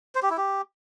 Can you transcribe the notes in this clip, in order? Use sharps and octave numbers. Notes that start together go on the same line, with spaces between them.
C5
G4
E4
G4